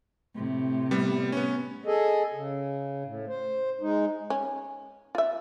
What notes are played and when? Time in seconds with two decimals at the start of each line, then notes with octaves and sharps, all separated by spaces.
0.35 A2 C3
0.91 G3 B3
1.32 B3 C#4
1.86 G#4 A4 D#5
2.34 C#3
3.04 A2
3.28 C5
3.81 G#3 D#4
4.30 C#4
5.15 F4 E5